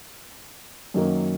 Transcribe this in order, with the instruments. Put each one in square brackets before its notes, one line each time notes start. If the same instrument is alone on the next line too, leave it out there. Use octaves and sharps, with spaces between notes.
[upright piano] F#2 D#3 F#3 A#3